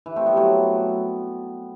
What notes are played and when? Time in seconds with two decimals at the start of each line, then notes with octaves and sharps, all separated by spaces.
0.06 E3
0.16 A3 C4
0.26 G3 B3
0.36 F#3 A3